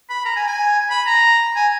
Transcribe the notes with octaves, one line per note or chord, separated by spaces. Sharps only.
B5
A#5
G#5
G#5
B5
A#5
G#5